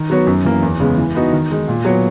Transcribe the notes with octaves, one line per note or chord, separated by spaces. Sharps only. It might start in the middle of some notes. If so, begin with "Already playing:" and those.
Already playing: D#3
F#3 B3 F#4 C#5
F#2
E3 A#3
E2
C#3 G#3 B3
E3
B3 D#4 F#4
D#3
G#3 D#4
A#2
F#3 B3 F#4 C#5